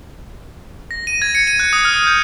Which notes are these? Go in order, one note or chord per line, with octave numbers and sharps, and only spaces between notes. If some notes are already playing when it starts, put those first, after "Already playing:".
A#6
D#7
G#6
C#7
D#7
F#6
D#6
F6
G6